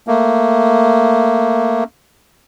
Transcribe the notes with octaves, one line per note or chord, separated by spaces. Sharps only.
A3 A#3